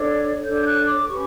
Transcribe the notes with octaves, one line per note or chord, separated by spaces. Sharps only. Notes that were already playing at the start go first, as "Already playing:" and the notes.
Already playing: D4 A4 C#5
D4 A4 C#5 G6
F#6
D6
C#4 G4 B4 C#6